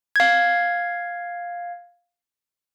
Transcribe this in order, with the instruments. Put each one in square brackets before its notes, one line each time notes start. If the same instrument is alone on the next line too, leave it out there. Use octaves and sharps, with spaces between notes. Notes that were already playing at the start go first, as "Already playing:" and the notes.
[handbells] F5 G#6